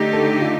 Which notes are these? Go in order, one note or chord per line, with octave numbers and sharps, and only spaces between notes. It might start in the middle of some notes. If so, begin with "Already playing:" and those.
Already playing: D3 A3 D#4 G4
A4
F4